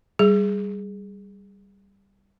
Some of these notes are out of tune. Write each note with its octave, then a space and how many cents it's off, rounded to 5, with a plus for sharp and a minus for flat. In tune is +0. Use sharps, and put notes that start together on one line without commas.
G3 +0 G#4 +0